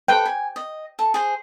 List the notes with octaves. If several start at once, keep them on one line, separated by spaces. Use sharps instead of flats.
A4 B4 G5
G#5
D#5
A4
G#4 C5